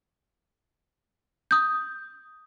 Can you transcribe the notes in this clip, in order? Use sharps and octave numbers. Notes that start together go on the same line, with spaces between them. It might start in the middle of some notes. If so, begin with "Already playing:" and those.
D#6 G6